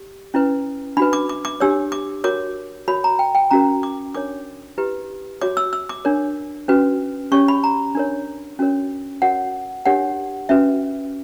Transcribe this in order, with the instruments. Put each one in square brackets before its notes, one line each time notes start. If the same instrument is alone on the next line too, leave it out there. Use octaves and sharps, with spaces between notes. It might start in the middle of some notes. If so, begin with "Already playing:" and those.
Already playing: [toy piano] G4
C#4 E4 B4
D4 B5
F#4 B4
D6
D6
D6
D4 G4 C#5 E6
D6
F#4 A#4 C#5 D6
F#4 A#4 C#5 B5
A#5
G5
G5
C#4 F#4 A#4 A#5
D6
D4 A#4 C#5 D6
E4 G4 B4
F#4 C#5 D6
E6
E6
D6
D4 A#4 C#5
C#4 F#4 B4
C#4 G4 C#5 C#6
B5
A#5
D4 A#4 C#5
C#4 F#4 A#4 C#5
F#4 A#4 C#5 F#5
D4 G4 A#4 C#5 F#5
C#4 F#4 B4 E5